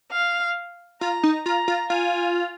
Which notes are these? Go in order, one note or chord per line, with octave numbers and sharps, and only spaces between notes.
F5
F4 A#5
D#4
F4 A#5
F4
F4 G#5